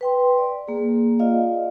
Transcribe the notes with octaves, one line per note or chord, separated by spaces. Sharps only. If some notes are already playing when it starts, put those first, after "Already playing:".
B4 G5 C6
D5
A#3 G#4
F4 D5 D#5 F5